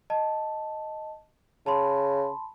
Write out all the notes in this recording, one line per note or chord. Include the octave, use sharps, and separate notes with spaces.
D#5 A5
C#3 A5 B5 C6